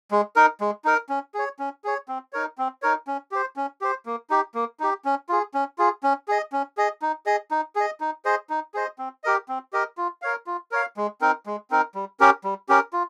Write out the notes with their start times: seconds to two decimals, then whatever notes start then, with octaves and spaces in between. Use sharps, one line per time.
0.11 G#3
0.36 D#4 A#4
0.61 G#3
0.85 D#4 A#4
1.09 C#4
1.34 G#4 C#5
1.59 C#4
1.84 G#4 C#5
2.08 C4
2.33 D#4 A#4 C#5
2.58 C4
2.82 D#4 A#4 C#5
3.07 C#4
3.32 G4 C5
3.56 C#4
3.81 G4 C5
4.06 A#3
4.30 D#4 G4
4.55 A#3
4.80 D#4 G4
5.05 C#4
5.29 F4 G#4
5.54 C#4
5.78 F4 G#4
6.03 C#4
6.28 G#4 D#5
6.52 C#4
6.77 G#4 D#5
7.02 D#4
7.26 G#4 D#5
7.51 D#4
7.76 G#4 D#5
8.01 D#4
8.25 G#4 C5 D#5
8.50 D#4
8.74 G#4 C5 D#5
8.99 C4
9.24 G4 A#4 D#5
9.49 C4
9.73 G4 A#4 D#5
9.98 F4
10.22 A#4 C#5 F5
10.47 F4
10.71 A#4 C#5 F5
10.97 G#3
11.21 C4 D#4 A#4
11.46 G#3
11.71 C4 D#4 A#4
11.95 G3
12.20 C#4 G4 A#4
12.44 G3
12.69 C#4 G4 A#4
12.93 F4